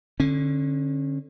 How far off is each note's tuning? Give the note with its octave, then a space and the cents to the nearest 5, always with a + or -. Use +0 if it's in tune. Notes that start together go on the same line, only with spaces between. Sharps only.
D3 +5 C#4 -30